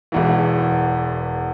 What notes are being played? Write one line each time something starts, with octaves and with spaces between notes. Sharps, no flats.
E1 E2 E3